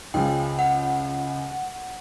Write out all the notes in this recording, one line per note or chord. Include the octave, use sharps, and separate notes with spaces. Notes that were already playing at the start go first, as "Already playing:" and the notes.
C#2 C#3 F3 G5
F#5